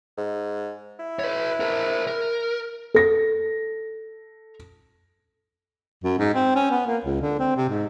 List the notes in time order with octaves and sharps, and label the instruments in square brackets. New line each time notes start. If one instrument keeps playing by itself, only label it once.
[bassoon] G#2
E4
[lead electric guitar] B4 C#5
A#4 C5
A#4
[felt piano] A4 A#6
[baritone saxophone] F#2
G#2
C4
C#4
B3
A#3
C#2
D3
C4
C3
G#2